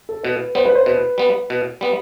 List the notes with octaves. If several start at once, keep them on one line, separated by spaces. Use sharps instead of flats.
A4
B2 B4
G3 B3 C5
B4
C5
B2 B4
G3 B3
B2
G3 B3